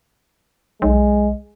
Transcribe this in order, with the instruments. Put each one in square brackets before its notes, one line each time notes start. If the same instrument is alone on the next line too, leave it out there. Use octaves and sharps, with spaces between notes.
[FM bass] B1 [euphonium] G#3